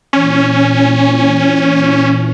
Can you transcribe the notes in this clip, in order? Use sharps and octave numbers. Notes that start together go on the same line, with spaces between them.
A#2 E3 C#4